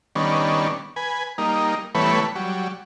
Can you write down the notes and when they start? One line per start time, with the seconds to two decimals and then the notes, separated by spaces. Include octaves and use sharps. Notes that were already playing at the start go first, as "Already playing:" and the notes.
0.15 D#3 G3 B3 C#4 D4
0.96 B4 G#5
1.38 G3 A#3 D#4
1.95 E3 G3 A3 B3 B4 C#5
2.35 F#3 G3